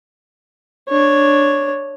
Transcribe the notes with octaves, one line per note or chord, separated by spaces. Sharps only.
D4 C#5